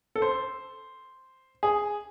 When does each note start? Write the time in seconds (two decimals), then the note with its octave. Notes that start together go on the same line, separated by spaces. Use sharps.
0.16 A4
0.22 C5
1.63 G#4